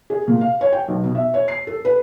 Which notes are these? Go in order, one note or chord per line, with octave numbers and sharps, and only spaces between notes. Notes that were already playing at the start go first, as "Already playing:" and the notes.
G#4
A#2
F5
C#5
G5
B1
B2
E5
C#5
C7
A4
B4